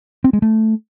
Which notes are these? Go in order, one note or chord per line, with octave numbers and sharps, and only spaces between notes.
C4
G#3
A3